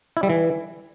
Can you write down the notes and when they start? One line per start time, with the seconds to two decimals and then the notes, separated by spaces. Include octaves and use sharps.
0.17 E4
0.23 G3
0.30 E3